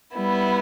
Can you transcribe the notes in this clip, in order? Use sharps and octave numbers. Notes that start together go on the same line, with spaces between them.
G3 B3 E4